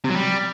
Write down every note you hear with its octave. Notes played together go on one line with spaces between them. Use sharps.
C3
F#3
G3